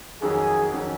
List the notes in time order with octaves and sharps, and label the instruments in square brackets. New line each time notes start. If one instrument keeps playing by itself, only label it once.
[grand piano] F2 D#3 F#3 C#4 [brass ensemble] G#4
[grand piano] F2 D#3 F#3 C#4